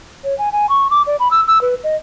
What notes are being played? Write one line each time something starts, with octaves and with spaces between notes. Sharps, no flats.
C#5
G#5
G#5
C#6
D6
D5
B5
E6
E6
B4
D#5